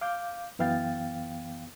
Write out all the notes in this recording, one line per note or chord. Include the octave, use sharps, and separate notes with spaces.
F5 D6 G6
F#2 E3 B3 F5 G5 A6